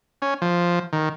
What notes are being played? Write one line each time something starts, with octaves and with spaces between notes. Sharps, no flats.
C#4
F3
D#3